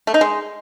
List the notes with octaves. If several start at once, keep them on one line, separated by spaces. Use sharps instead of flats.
A3
D#4
G#3